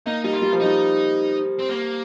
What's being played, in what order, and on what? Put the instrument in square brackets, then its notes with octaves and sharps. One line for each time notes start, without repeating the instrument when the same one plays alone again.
[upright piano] A#3 [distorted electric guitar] D#4
[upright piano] G3 [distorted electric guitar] D#4
[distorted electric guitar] F4
[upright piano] G3
F3
[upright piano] G3 [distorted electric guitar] D#4
[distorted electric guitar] C4
A#3